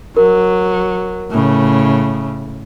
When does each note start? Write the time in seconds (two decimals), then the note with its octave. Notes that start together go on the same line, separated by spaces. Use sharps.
0.17 F#3 A#4
1.31 A2 C#3